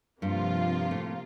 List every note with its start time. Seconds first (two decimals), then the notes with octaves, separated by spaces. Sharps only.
0.22 G2 C3 F3 A#3 F4
0.91 A2